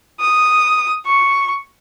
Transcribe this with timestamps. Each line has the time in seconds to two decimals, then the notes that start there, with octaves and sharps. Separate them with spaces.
0.20 D#6
1.06 C#6